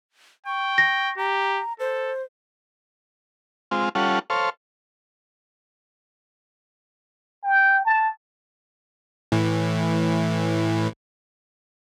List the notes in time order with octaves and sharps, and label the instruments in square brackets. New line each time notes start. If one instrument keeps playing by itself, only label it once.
[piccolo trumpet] G5 [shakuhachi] C#6
[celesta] A#6
[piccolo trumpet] G4 [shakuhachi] A#5
[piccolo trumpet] A4 [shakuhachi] C5
[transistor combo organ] G#3 C4 F4
G3 C#4 F4 A4 F#5
A4 C5 C#5 F5
[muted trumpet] G5
A5
[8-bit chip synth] A2 E3